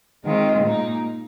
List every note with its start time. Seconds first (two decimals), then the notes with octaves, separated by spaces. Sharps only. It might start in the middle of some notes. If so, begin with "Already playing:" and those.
0.25 D#3 G#3 C4 F4
0.64 A#2 A#3 D#4